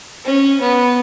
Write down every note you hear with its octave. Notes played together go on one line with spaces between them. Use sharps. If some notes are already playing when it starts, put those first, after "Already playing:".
C#4
B3